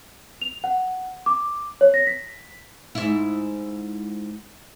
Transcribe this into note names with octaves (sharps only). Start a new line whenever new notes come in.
F7
F#5
D6
C#5
A#6
B6
G#2 E4